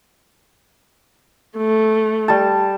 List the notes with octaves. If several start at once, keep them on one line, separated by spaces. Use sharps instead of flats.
A3
G3 A5